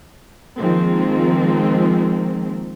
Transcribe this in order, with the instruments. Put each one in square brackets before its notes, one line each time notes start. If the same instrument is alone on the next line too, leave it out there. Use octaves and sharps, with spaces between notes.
[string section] D#3 F3 G#3 A#3 C4